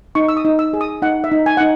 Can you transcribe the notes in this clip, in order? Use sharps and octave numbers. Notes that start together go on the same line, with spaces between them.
D#4 C#6
E6
D#6
D#4
E6
G#4
D#6
D#4 F#5
E5
D#4
G#5
D#4 F#5